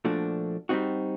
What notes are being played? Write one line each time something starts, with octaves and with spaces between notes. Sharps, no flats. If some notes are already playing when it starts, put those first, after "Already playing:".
A#2 F3 A3 D4 F#4
G3 C4 D#4 F#4